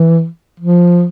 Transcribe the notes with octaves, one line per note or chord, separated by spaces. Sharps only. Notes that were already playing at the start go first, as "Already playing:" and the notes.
Already playing: E3
F3